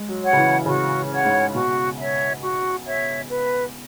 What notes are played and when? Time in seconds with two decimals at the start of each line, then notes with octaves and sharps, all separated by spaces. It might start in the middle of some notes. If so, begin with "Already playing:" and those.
Already playing: G#3
0.09 F#3
0.23 C#5 F#5
0.33 C#3
0.37 E3
0.66 C#3 F#4
1.11 C#5 F#5
1.25 G#2
1.54 B2 F#4
1.97 C#5 E5
2.41 F#4
2.86 C#5 E5
3.29 B4